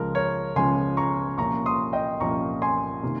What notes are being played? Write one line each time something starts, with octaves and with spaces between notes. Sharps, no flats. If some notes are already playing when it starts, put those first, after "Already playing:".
Already playing: C#2 C#3 F3 G#3 C#4 A#4
A#4 C#5
C#2 C#3 F3 G#3 C#4 G#5 C6
A#5 C#6
C2 A#2 F3 A#3 C#4 A#5 C#6
C6 D#6
D#5 G5
C2 A#2 F3 A#3 C#4 A#5 C#6
G#5 C6
C3 D#3 A#3